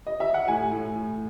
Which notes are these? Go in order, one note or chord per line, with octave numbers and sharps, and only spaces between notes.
D#5
E5
F#5
A2 G#5
A2
A2